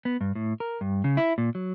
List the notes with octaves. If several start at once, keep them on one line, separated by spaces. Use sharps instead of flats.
B3
G2
A2
A#4
G2
C#3
E4
A#2
F#3